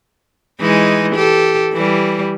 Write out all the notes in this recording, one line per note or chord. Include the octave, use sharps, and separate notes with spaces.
E3 G#3 D#4
G4 A4
E3 G3